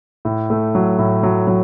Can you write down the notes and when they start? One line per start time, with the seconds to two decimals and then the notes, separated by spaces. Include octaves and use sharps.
0.25 A2
0.50 A3
0.75 F#3
0.99 A2
1.23 F#3
1.47 F#3